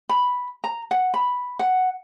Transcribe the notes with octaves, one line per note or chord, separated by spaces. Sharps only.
B5
A#5
F#5
B5
F#5